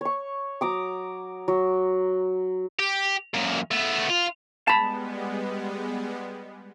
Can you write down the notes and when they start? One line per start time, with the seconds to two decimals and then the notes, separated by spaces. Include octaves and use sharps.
0.01 C#5 C#6
0.61 F#3 A#5 D6 D#6
1.48 F#3
2.79 G4
3.34 F#2 A#2
3.71 A3 B3
4.10 F4
4.68 G3 G#3 B3 A5 B5